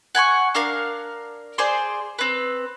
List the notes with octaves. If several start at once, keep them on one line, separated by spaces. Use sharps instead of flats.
F#5 G#5 B5 C#6
D4 A#4 F5
G#4 C5 D5 C6
C4 B4